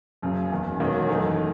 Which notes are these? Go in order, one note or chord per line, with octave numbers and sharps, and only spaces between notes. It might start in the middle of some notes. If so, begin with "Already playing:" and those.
F#1 F#2 C#3 F#3
F#1 E2 D#3
E1 E2 D#3 F#3 C#4
F#1 F#2 E3 A3 D#4